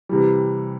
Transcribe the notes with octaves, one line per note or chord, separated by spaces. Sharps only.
C3 E3 G3